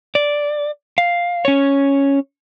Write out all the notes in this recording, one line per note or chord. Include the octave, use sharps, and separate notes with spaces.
D5
F5
C#4 C#5